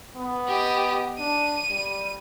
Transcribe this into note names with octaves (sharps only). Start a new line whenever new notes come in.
B3
G4 D#5
D4 D#7
G3